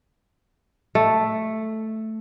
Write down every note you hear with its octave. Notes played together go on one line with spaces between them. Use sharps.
A3